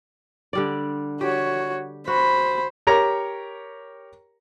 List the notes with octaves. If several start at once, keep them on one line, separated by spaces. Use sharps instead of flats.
D3 G3 D5
F#4 G4 C#5
F#4 C5 B5
G4 A#4 C#5 A#5